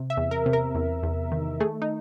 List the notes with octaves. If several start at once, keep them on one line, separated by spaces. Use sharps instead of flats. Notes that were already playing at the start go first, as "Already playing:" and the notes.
Already playing: C3
E5
E2
A#4
C3
A#4
E2
E2
D#3
A3 G#4
D#4